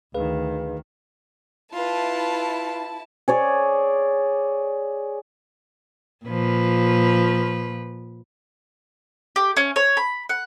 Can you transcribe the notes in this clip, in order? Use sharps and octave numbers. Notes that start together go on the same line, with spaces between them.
D2 D#3 G#4 B4 F5
E4 F4 B4 A5
G#4 C#5 D5
A#2 F3 B4
G4
C#4
C#5
B5
F#5